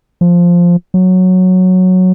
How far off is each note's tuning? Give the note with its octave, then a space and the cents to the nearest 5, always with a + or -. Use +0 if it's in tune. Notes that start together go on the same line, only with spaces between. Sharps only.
F3 +0
F#3 -5